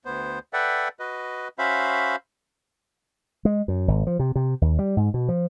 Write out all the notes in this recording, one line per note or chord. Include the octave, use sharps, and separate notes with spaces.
D2 B3 C5
A4 B4 D5 E5 F#5 G5
F#4 B4 D#5
C#4 F#4 C5 E5 F5 B5
G#3
F#2
G#1
F3
C3
C3
D#2
G3
G#2
B2
F3